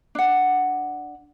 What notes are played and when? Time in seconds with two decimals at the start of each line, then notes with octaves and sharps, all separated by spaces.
0.15 D4 F#5